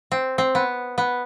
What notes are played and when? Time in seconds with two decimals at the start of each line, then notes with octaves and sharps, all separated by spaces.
0.12 C4
0.38 C4
0.55 B3
0.98 B3